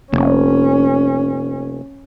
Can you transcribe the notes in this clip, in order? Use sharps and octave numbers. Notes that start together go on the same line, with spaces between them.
F1 C3 A#3 C#4